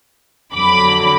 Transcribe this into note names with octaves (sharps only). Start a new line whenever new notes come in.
F2 D3 F#3 B5 D6